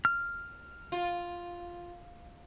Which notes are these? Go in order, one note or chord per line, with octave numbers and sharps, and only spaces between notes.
F6
F4